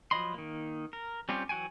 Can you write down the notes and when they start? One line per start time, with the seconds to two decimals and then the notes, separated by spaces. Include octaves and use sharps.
0.11 F3 F#3 D#5 B5 C6
0.34 D#3 A#3
0.93 A#4
1.29 G3 C4 C#4 F4 G4
1.49 E3 F#3 F#4 G5 G#5